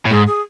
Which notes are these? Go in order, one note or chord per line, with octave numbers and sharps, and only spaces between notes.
A2
G#2 G#4
G#4